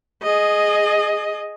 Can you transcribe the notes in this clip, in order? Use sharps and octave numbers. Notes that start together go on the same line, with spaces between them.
G#4 D#5